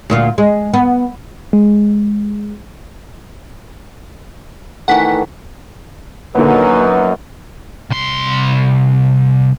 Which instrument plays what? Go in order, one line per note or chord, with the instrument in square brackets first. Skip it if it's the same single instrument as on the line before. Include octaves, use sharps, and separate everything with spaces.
[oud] D2 A#2 F4
G#3
B3
[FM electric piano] G#3
[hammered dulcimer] D#3 E3 A3 [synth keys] F#5 B6
[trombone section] F#2 [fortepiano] A#2 D3 [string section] F#3 A#3 D#4 [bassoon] B3
[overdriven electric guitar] C2 C6